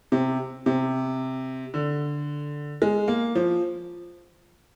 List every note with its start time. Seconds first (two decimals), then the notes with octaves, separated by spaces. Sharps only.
0.12 C3
0.66 C3
1.74 D3
2.82 G#3
3.08 A#3
3.35 F3